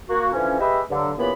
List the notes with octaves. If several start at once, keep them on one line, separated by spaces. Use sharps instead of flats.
A#3 F#4
D3 E3 F3 C#4
G4 G#4 B4 D#5 E5
G2 D3 F#3
A#2 C#3 E3 B3 G4 B5